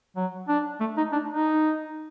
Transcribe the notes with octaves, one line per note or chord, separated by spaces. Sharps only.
F#3
D4
A3
D#4
D4
D#4